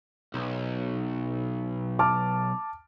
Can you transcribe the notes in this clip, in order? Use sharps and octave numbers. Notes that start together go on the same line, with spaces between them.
B1
A5 D6 F6